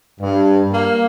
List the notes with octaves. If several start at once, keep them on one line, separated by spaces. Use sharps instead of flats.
G2
A#3